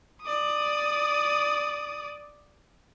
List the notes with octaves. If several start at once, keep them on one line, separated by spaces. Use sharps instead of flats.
D5 D#6